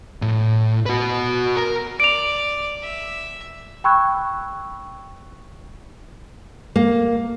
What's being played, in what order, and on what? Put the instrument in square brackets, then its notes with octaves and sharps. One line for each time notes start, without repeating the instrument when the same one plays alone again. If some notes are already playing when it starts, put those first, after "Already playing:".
[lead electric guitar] A2
F#4 B4
A#4
[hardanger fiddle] D5 [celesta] D7 F7
[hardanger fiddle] E5
[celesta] G5 B5 C#6 E6 F#6 G#6
[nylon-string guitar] A#3